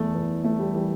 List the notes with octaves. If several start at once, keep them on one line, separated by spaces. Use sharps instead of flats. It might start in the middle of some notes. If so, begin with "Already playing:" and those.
Already playing: E2 E3 A3
E2 E3
E2 E3 A3
G3
E3 G3